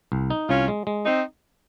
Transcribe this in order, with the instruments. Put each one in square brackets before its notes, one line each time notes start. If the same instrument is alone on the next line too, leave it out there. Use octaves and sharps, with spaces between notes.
[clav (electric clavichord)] C2
D#4
[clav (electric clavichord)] C2 [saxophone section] C#4 F4
[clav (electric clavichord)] G#3
G#3
[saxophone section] C4 D#4